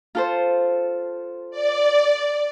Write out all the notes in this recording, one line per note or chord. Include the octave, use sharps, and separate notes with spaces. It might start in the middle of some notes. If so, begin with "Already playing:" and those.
F4 A4 C5
D5